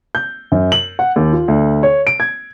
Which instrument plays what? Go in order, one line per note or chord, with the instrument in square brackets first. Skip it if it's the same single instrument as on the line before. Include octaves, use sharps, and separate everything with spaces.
[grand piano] G6
F#2
F#7
F#5
D#2
F4
D2
C#5
D7
G#6